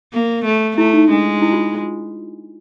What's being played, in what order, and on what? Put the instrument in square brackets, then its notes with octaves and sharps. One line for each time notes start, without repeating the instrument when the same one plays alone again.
[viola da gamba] A#3
A3
[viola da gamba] A3 [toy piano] E4
[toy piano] D#4
[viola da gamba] G#3 [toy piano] D4
[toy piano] E4
F4